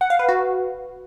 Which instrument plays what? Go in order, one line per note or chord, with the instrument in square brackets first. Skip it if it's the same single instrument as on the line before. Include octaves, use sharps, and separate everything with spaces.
[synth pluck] F#5
F5
B4
F#4